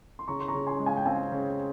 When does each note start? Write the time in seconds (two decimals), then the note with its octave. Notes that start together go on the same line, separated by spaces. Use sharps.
0.19 C6
0.28 C#3 A#5 C#6
0.40 C6
0.48 A#5 C#6
0.55 C#3
0.67 G#5 C6
0.79 G#3
0.86 F5 G#5
0.97 G5
1.06 C4 F5 G#5
1.32 C#3